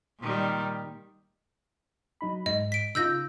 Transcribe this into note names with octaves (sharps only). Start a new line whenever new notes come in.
A#2 D#3 G3
F#3 D#4 B5
G#2 D#5
B6 D7
C#3 D#4 F4 E6 G6 A#6